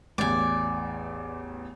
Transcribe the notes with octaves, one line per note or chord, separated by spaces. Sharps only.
A1 E2 D5 G#5